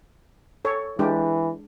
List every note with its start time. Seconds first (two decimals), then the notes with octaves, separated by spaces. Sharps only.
0.65 A4 C#5
0.99 E3 G#3 D4 G4